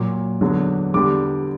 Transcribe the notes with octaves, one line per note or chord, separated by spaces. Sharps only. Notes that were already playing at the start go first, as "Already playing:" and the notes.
Already playing: A#2 F#3 D6
E2 D3 F#3
E2 D3 G3 D6